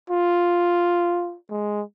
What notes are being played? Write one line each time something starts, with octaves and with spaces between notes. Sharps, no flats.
F4
G#3